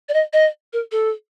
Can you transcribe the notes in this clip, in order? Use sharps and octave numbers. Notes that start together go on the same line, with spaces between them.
D5
D#5
D#5
A#4
A4